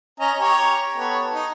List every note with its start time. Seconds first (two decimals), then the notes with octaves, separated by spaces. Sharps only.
0.20 C#4 D#5 A#5
0.40 G4 C#5 A#5
0.97 B3 A4 C#5
1.33 D#4